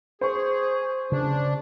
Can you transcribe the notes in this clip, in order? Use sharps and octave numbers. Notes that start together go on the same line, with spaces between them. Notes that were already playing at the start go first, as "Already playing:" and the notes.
G#4 C5 C#6
C#3 D4